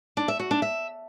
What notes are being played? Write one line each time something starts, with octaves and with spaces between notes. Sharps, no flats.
D4
E5
F#4
D4
E5